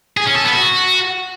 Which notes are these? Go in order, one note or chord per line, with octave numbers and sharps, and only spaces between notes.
G#4
C#4
A4
B3
F#4